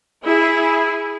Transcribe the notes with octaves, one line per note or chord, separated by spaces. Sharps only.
E4 G#4